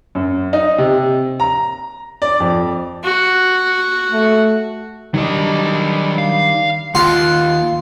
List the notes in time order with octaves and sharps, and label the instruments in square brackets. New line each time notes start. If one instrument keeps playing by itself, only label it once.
[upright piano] F#2
D#4
C3
A#5
D5
F2
[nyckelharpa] F#4
[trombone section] A3
[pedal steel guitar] D#3 G3 D4 [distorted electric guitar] F#3 D#5
[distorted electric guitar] F5
[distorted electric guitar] D#2 [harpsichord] F4 [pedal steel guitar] F#5 F#6